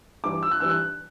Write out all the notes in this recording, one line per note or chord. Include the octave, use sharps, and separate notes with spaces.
G2 E3 G3 D6
E6
F#6
G2 E3 G3 E6
F#6